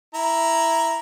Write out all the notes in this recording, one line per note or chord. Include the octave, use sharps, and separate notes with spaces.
E4 A#5